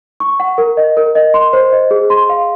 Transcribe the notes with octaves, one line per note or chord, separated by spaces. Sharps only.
C#6
F#5
A#4
D#5
A#4
D#5
C6
C5
D#5
G#4
C6
F5